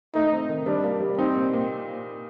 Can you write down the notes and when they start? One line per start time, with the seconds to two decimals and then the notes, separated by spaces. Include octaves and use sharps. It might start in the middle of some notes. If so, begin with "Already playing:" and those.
0.15 A3 D#4
0.32 C4
0.49 D#3
0.66 G3 D4
0.84 A#3
1.01 G3
1.18 C4 D#4
1.35 A#2
1.53 A#2